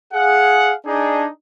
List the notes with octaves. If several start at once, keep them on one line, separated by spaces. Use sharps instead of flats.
G#4 F5 F#5
D4 D#4 G#4